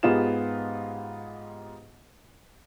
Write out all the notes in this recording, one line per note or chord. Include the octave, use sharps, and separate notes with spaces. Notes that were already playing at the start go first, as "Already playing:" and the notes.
G#2 B3 F4 G4 G#4 E7